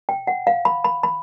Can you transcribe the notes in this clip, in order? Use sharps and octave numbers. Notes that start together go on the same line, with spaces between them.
G5
F#5
F5
B5
B5
B5